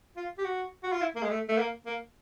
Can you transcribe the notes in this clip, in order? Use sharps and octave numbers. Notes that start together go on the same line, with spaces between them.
F4
G4
F#4
F#4
F4
E4
A#3
G#3
A3
A3
A#3
A#3